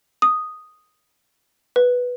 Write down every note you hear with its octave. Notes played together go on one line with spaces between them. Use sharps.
D#6
B4